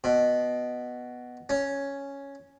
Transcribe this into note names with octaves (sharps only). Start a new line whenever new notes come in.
B2
C#4